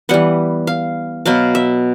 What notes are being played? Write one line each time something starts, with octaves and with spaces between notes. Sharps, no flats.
E3 G3 B3 F#5
F5
B2 F#3 B3 F5
E5